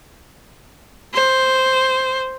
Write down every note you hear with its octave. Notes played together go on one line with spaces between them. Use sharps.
C5